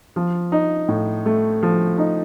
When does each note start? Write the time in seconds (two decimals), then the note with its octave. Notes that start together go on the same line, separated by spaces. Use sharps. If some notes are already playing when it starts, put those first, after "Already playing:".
0.16 F3
0.52 D#4
0.88 A2
1.26 A3
1.63 F3
1.98 D#4